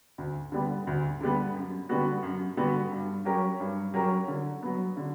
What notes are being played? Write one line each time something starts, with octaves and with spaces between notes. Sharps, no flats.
D2
D3 G3 B3
D2
D3 G3 B3
F#2
D3 G3 B3 F#4
F#2
D3 G3 B3 F#4
G2
F#3 C#4 G4 A#4
G2
F#3 C#4 G4 A#4
D3
F#3 B3
D3